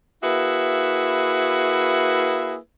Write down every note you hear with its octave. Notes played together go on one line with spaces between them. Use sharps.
A#3 E4 F#4 G#4 B4 E5